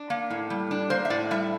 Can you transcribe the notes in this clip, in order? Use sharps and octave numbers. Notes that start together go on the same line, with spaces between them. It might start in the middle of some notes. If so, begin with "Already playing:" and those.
Already playing: D4
A#3
A2
G3
D4
A#3 C5
E5
A2 D5
G3 E5